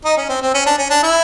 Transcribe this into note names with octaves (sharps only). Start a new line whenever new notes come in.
D#4
C#4
C4
C4
C#4
D4
C#4
D4
E4